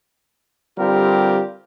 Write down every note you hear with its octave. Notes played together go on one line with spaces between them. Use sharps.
D3 G3 C4 F4 G4 A#4